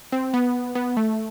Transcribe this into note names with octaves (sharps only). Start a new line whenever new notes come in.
C4
B3
B3
A3